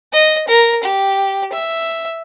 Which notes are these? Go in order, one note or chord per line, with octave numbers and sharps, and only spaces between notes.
D#5
A#4
G4
E5